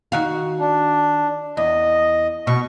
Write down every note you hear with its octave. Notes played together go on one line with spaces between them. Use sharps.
D#3 F#4 F5
D4
E2 D#5
B2 C#6